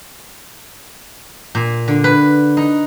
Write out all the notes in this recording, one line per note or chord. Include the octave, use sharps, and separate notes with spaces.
A#2
D3
B4
D#4